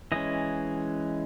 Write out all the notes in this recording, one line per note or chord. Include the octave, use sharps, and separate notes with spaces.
E3 G#3 C#4 D#5